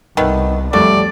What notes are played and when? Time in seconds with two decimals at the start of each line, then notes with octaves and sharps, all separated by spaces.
0.17 C2 D#3 A3 B3
0.73 F2 C3 F#3 G3 A3 D5